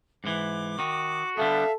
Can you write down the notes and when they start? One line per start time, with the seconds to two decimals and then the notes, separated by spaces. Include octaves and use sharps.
0.24 G#2 E3 D6
0.79 D#3 F#4
1.37 D3 G3 B3 A4 E5 F5